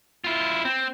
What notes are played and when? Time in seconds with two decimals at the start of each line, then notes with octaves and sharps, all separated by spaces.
0.24 E4 F4
0.65 C4